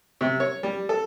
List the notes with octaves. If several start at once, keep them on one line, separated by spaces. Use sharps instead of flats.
C3
C#5
G3
A4